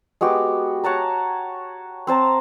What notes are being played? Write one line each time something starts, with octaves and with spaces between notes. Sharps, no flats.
G#3 B3 F#4 G4
C#5 F#5 A5 A#5
C4 C5 A5 A#5